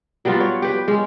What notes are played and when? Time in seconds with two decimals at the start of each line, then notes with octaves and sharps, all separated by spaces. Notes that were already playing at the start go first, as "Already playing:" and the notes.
0.25 F#3 G3 B3 F4
0.40 C#5
0.62 G4 B4
0.88 G#3 C#4